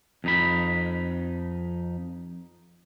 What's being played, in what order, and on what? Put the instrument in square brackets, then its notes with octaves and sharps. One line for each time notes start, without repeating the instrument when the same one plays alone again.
[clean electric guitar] F2 D#4 B5